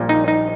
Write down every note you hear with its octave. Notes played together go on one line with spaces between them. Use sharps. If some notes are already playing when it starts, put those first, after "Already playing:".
Already playing: A#1 A#2 G3 A#3
D#4
D#4